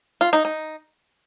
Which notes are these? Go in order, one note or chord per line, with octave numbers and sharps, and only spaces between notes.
F4
D#4
D#4